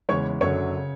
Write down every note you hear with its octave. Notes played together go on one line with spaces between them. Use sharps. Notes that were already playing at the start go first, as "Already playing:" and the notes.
E2 C#3 E3 G#3 C#5 C#6
F#1 F#2 D3 F#3 C#5 C#6
C#3